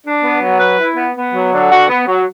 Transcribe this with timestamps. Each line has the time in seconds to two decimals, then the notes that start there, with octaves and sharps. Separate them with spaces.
0.05 D4
0.22 B3
0.41 F#3
0.59 B4
0.78 E4
0.96 B3
1.15 B3
1.33 F#3
1.52 D3
1.69 F#4
1.89 B3
2.07 F#3